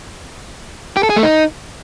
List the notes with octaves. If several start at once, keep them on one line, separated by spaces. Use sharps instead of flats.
G4
A4
G#4
A3
D#4